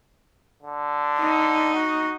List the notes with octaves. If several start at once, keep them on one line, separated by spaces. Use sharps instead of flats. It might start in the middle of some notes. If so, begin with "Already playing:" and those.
D3
D#4
F#4